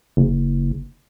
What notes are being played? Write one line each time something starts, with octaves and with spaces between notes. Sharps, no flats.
F#1